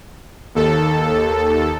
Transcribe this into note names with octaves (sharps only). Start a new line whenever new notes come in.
D#2 A4